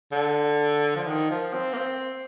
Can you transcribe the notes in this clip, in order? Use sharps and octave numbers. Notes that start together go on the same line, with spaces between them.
D3
F3
D#3
F3
C4
A#3
C4